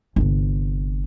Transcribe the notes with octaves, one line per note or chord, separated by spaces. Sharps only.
G1 C3